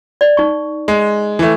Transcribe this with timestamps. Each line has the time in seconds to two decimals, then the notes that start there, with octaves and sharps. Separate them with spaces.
0.21 D5
0.37 D#4 C#6
0.88 G#3
1.39 E3 A3